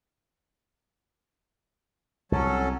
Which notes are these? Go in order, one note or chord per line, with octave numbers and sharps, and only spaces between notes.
C2 F#3 C#4 A4